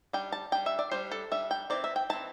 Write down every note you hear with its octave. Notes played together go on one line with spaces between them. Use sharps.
G3 D4 G5
A5
G3 D4 G5
E5
D5
G3 D4 C5
A4
G3 D4 E5
G5
E3 C4 D5
E5
G5
E3 C4 A5